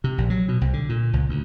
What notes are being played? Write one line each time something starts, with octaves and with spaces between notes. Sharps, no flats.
C3
A#1
F#3
B2
C2
D3
A#2
C#2
D2